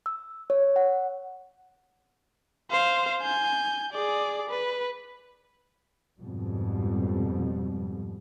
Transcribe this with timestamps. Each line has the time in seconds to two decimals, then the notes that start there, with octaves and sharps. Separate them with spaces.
0.06 E6
0.50 C#5
0.76 F#5
2.71 C5 F5
3.22 G#5 G6
3.93 G#4 D5
4.50 B4
6.19 F2 G#2 B2 G3